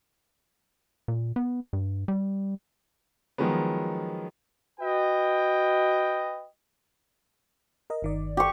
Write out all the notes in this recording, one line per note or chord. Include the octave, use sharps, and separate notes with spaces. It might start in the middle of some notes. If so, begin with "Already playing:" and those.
A#2
B3
G2
G3
D#3 F3 F#3 G#3 B3
F#4 B4 D#5 G5
A#4 D#5
G1 D#3 D5
G4 C#6